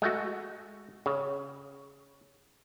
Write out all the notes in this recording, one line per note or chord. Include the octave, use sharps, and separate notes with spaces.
G#3 A3 F#4
C#3